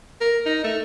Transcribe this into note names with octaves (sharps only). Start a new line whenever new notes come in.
A#4
D#4
A3